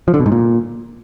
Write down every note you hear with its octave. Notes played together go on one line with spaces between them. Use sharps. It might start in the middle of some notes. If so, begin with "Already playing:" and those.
F3
D3
B2
G#2
A#2